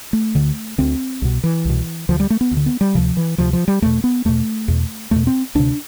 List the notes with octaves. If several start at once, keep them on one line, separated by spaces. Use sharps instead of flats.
A3
D2 D3
D2 D3 C4
C2 B2
E3
C2 B2
D2 D3 F3
G3
A3
B3
D2
D3
B3
G3
D2 C3 F3
E3
D2 C3 F3
F3
G3
E2 B2 A3
B3
E2 B2 A3
E2 B2
E2 B2 A3
C4
D2 C3 D4